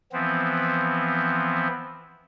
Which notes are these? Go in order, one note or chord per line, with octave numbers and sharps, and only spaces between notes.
E3 F3 B3 C4